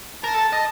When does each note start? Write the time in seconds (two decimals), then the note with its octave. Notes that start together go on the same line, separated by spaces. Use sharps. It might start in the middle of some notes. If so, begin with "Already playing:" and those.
0.24 A#4 A5
0.34 A4
0.53 D#5